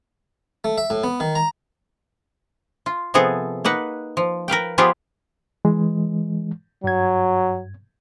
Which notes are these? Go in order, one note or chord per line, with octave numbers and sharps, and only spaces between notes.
A3
E5
A2
B3
D#3
A#5
F4
C3 F3 B3 G#4 A4
A#3 D#4 B4 F#5
F3
A#4 B4 F5 G5
F3 B3 F4 G4 G#4 B4
E3 G#3
G2 F#3 G#6